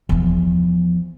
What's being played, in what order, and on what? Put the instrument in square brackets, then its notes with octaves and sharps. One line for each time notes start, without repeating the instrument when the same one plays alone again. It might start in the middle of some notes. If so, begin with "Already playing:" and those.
[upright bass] E2 F3